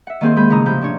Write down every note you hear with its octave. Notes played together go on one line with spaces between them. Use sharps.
E5 F#5
D#3 A#3 C4 G#4 C5
G#3 G#4 B5 G6
A2 C#3 E4 A#5 D#6
C3 F3 B5 G6
C3 D4 C#5